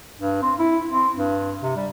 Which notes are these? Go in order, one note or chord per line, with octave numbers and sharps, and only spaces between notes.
G2
C4
E4
C4
G2
C3
G3